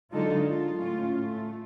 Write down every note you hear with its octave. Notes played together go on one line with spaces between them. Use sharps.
D3 F#3 G#3 D#4 F4 A4
F4
A2 C#4 F4
A3